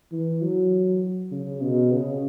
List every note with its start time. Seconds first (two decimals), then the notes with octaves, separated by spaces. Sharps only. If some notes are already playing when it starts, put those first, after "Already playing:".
0.12 E3
0.42 F#3
1.32 C#3
1.62 B2
1.92 C#3